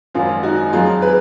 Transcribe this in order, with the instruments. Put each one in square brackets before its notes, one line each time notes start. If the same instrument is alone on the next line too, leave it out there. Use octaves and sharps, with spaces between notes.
[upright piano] G#1 F#2 F3 C#4 F4
D#4 F#4
F2 D#3 F#3 F4 G#4
G#4 B4